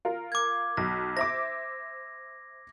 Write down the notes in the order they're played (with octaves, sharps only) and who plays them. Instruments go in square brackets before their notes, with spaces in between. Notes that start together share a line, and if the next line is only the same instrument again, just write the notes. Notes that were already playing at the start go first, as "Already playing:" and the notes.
[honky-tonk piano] F4 A#4
[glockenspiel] D6 G#6
[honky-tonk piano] B1 [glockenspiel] A#6
[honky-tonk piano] C5 E5 D6 [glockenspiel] A#6